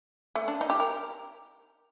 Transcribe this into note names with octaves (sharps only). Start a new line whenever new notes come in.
A3
D4
D#4
G4
A#4